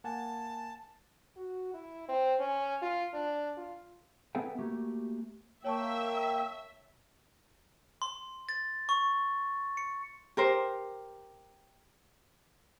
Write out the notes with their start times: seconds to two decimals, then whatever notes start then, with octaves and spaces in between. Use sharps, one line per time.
0.04 A#3 F#5 G#5 A5
1.36 F#4
1.74 E4
2.09 C4
2.40 C#4
2.82 F4
3.13 D4
3.57 F4
4.35 B3 G#4 A4 B4 E5 G5
4.59 A3 A#3 F#4 G4
5.65 A#3 C#5 E5 G5 A5 C#6
8.02 C6
8.49 A6
8.89 C#6
9.77 C#7
10.37 G4 A#4 C5